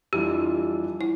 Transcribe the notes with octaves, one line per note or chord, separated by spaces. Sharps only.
F2 E3 G3 D4 F4 G4
E4